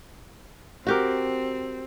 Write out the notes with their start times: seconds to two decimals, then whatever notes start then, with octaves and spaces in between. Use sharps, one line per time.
0.87 C4 F#4 G4 A#4